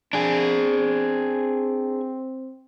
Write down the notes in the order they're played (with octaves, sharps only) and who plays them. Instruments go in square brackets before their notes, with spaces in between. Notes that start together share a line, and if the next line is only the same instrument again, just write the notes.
[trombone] C4 [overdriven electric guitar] D4 G#4